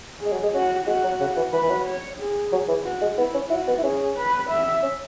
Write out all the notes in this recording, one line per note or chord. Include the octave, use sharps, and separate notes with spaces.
G#4
G#3
F#3
G#3
C#4 F#4
G#3 F#4
F#3
C#3
E3
E3 B4
E3
F#3
C#5
G#4
F#3
E3
F#4
G#3
B3 E4
C#4
E4 F#4
B3
E4
C#4 G#4
B4
E5
C#4